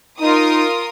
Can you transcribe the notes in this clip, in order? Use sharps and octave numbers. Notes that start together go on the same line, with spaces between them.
D#4 F4 A#4 D#6